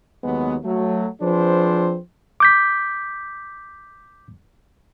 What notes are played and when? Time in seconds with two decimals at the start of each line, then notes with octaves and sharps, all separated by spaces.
0.24 D#2 F#3 G#3 B3
0.65 F#3 A3
1.22 F3 C4 D4 G#4 B4 C5
2.40 D6 G6 B6